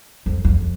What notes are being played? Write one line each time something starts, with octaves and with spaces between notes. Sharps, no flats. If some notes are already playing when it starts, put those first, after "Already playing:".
F2
F2